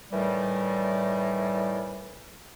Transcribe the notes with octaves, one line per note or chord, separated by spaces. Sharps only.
A2 D#3 E3 G3